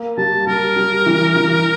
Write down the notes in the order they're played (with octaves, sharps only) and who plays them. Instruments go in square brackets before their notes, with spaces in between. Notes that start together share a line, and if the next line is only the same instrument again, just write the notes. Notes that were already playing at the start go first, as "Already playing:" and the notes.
Already playing: [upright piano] A#3
[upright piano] G3 [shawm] A5
[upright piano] G3 [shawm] A#4
[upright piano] G3
E3
E3